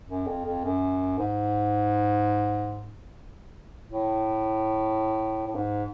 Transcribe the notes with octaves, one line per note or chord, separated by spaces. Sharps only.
F#2
F2
F2
F#2
G#2
A2
A2
G#2